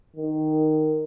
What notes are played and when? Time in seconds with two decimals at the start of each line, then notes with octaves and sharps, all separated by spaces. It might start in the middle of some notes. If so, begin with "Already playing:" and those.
0.16 D#3